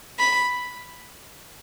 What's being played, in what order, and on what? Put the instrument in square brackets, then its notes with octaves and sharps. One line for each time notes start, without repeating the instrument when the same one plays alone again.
[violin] B5